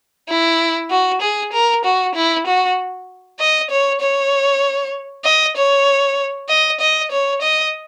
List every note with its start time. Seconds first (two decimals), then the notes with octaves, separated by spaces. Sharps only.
0.29 E4
0.91 F#4
1.21 G#4
1.52 A#4
1.85 F#4
2.15 E4
2.47 F#4
3.40 D#5
3.71 C#5
4.01 C#5
5.25 D#5
5.57 C#5
6.49 D#5
6.80 D#5
7.12 C#5
7.42 D#5